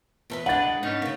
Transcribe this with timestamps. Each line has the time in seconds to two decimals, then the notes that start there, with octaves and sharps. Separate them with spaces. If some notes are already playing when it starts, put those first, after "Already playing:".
0.30 E2 A4 B4
0.46 G#3 D4 B4 F#5 A6
0.83 G#2 B3 C#4 D#4
1.02 C#3 A#3